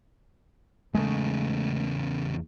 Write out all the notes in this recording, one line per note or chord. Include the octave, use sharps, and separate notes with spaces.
E2 C#3 G#3 A3